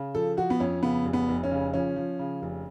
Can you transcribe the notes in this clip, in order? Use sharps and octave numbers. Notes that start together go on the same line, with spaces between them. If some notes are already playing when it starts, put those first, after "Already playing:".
Already playing: C#3
F3 A4
F3 F#4
B3
F2 C#4
C#3 B3
F1
B3
F1
C#4
C#3
F3 C#4
F3
C#3
F1